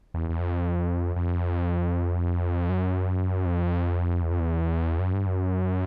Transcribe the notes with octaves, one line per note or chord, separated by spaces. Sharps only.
E2
E2
F2
F2
F#2
F2
E2
F2
E2
F#2
G2
F#2